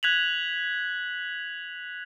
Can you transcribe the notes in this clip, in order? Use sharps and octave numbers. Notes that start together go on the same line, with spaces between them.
F#6 G#6 B6 F7 F#7